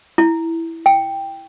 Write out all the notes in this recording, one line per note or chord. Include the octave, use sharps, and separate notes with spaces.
E4
G5